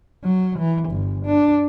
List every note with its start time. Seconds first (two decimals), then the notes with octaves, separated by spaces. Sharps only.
0.24 F#3
0.59 E3
0.89 G1
1.26 D4